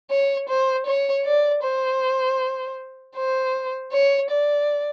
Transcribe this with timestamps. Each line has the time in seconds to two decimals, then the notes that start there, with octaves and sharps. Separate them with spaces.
0.10 C#5
0.49 C5
0.86 C#5
1.25 D5
1.63 C5
3.16 C5
3.92 C#5
4.31 D5